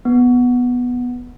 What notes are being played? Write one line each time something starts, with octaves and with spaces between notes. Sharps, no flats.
B3